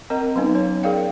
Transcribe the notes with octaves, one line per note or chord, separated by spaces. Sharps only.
C4 A#4 D#5 A#5
F#3 B3 C#4 D#4
C#5
G#4 A#4 D5 F5 G5